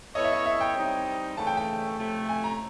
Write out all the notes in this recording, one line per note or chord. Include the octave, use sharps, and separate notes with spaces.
B3 E4 A4 C#5 D#5
E5
D#5
E5
G5
G3 C4 D#4
C#3 E3 A3 A5
G5
G5
C3 F3 A3
G#5
A#5